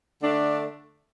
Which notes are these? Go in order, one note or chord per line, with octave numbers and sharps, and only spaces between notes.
D3 A3 D4